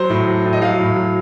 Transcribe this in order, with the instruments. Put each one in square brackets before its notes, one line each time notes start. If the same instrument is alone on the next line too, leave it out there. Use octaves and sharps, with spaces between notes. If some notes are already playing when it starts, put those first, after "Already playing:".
Already playing: [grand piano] F#3 C5
A2
F#3
A2
D#5
F#3 F5
A2
F#3